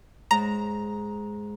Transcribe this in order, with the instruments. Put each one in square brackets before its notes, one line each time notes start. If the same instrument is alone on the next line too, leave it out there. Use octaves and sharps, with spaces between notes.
[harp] G#2 [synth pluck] A#5